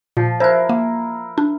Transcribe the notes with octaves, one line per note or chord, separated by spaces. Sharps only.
A#2 F3
E4 A#4 C5 F#6
A#3
D4